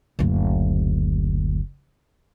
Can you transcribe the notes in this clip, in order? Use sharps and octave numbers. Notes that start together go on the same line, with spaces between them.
F#1 D2